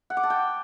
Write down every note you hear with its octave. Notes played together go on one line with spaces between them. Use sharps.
F#5
D6
A5
G5